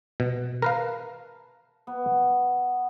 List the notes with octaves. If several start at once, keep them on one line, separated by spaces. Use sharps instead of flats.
B2
A#4 B4 F5 A5
B3